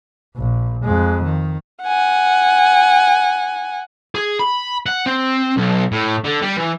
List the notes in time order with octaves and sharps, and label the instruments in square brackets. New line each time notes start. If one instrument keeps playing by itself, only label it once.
[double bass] A#1
F2 G#3
D#3
[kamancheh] F#5 G#5
[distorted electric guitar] G#4
B5
F#5
C4
B1
A2
D3
G3
E3